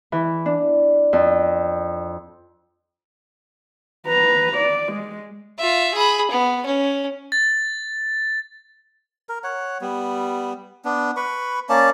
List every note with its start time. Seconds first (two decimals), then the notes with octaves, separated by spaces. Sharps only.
0.12 E3
0.46 D4
1.13 F2
4.07 B4 A#5
4.57 D5
4.92 G#3
5.59 F4 E5
5.94 G#4 B5
6.31 B3
6.66 C#4
7.32 A6
9.29 A#4
9.44 C#5 F#5
9.81 G3 B3
10.85 B3 D4
11.17 B4 B5 C#6
11.69 A#3 C#4 D5 A5